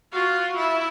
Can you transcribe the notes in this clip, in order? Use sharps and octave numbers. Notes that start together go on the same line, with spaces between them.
F4 F#4
E4